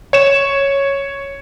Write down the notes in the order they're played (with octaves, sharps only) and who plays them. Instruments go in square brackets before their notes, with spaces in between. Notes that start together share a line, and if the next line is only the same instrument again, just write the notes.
[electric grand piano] C#5 E7